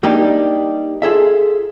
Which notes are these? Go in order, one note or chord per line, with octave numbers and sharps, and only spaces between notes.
G3 A#3 D4 D#4 G4
F4 G#4 A4 E5